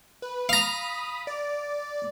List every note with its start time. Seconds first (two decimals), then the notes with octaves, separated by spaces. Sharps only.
0.22 B4
0.49 F5 A#5 B5 D#6 B6
1.27 D5